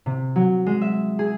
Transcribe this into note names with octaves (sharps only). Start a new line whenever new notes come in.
C3
F#3
G#3
E5
G#4